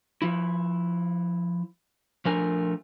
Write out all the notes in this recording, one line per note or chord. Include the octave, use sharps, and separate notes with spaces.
F3 E4
F3 A3 D4 A#4 G#5